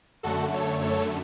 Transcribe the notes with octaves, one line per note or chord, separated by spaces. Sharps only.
F#2 D3 A3 F#4 A4
A4 C#5
A4 C#5